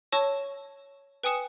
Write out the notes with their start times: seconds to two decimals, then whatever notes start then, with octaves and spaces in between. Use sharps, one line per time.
0.12 C#5 A5 C#6 E6 A#6
1.24 B4 G5 G#5 D#6 C#7 E7